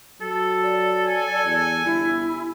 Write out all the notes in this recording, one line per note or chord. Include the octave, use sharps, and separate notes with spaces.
F#3 A4
D5
G#5
E2
G1 E4